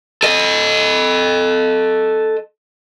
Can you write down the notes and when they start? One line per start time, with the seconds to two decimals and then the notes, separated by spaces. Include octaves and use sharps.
0.23 A4 D#5